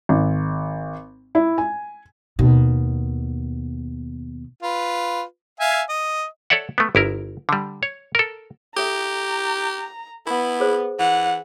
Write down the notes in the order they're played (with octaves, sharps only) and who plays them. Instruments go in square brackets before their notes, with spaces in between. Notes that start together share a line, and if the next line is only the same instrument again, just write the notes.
[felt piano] G#1
E4
G#5
[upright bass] D#2 B2
[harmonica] F4 B4
E5 F5 G#5
D#5
[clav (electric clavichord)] A4 C#5 D5 E5 F#5
A3 B3
G1 E4 A#4
D3 G3
C#5
A4 A#4
[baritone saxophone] G4 [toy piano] A4 E5 [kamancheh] A#5
[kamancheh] B3 [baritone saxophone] E4
[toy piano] G#4 C5
[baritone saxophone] E3 [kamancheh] F#5